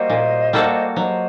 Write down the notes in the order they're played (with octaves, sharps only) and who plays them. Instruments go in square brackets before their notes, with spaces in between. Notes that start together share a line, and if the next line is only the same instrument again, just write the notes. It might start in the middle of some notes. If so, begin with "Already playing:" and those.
Already playing: [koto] G3 A#3 F#4 [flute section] C5 D#5
[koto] A#2
G3 A#3 F#4 A4
[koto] F#3 [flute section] C5 D#5